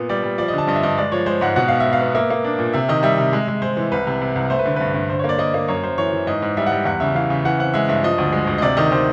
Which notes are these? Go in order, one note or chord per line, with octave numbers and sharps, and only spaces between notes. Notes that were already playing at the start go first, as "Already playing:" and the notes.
Already playing: A#2 B3
G3 D5
G3
F3 D5
D#5
D3 A5
G2 D#5
E5
G2 D#5
G#3 D5
F3 C#5
G#3 C5
G#2 F#5
B2 F#5
B3 F5
E5
B3
F5
B3
A#3 E5
A#3
D4
A#2
C3 E5
D#3 D#5
G3 E5
C3
G#3
G#3
G#3 C5
E3
C2 B4
C3
C3
C2
A3 C5
B4
D3
G2 B4
G2
D3 C5
A#3 C#5
D5
A#3 D#5
A#3
F#2 C#5
F#2 C5
E3 C#5
E3
G#2 D#5
G#2
G3 E5
F#5
G3
E2 F#5
C#3 E5
E3 F5
C#3
E3 F#5
C4 F#5
G#3 E5
G2 E5
F3 D#5
D2
G#3
D2
D#5
C3 D5
D#3 D#5
D#3 C5